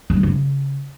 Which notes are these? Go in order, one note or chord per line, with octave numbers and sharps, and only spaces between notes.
G3
D3
F#2
C#3